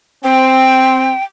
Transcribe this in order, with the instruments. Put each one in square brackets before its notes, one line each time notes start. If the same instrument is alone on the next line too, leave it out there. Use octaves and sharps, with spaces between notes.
[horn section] C4 [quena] G5